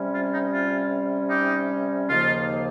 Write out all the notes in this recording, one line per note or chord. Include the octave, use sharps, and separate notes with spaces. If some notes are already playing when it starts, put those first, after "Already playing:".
Already playing: C3 G3 C#4
F4
D#4
F4
D#4 G4
D#2 C#3 F3 A#3 D#4 F4